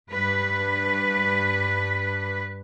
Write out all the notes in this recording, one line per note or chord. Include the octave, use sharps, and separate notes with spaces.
G2 B4